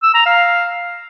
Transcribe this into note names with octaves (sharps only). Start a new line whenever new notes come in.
E6
A#5
F5